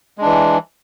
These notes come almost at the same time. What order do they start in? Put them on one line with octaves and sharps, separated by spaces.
G#3 D4 E3